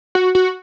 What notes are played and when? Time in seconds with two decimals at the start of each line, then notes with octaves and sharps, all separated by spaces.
0.15 F#4
0.35 F#4